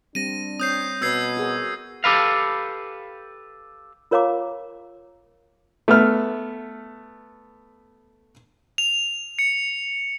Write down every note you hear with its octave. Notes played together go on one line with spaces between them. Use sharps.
G3 C4 D4 A#6 D#7
C4 C#5 D#6 G6 C7
B2 B3 B4 C#5 E6 G#6 C7
F#4 G#4 A#4
G4 A4 B4 F5
F4 A#4 C#5 F5 A#5 D6
A3 B3 F6
F7
C#7